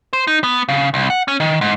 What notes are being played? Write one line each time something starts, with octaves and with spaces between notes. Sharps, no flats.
C5
D#4
B3
C#3
C2
F#5
C#4
D#3
G#2